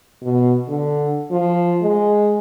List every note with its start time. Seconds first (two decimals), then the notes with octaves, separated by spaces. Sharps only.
0.23 B2
0.69 D3
1.31 F3
1.82 G#3